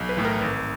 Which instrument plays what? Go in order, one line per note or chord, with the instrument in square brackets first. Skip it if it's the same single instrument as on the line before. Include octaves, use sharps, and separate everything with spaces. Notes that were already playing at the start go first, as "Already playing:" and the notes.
Already playing: [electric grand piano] B1
B4
A2 E3
A#4
G#1